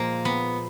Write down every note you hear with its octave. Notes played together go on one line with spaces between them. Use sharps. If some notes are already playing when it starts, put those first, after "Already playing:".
Already playing: A#2 F3 G#3 A#3
B3